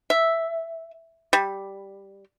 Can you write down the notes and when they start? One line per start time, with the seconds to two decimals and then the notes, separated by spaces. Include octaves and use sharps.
0.10 E5
1.33 G3